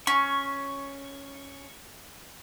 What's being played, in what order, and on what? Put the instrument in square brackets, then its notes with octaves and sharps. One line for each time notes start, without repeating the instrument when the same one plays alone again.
[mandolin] C#4 [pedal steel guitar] C#6